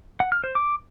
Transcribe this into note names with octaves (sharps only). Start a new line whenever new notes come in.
F#5
F6
C5
D6